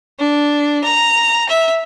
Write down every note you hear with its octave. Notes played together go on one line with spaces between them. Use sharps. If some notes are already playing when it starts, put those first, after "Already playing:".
D4
A#5
E5